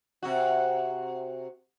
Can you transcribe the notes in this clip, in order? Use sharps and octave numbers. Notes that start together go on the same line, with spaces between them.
C3 F#4